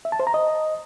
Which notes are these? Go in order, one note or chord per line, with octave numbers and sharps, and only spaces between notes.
E5
A5
C5
A#5
D#5